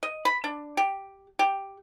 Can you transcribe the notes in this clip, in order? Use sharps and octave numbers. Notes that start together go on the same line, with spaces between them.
D#5
B5
D4
G4
G4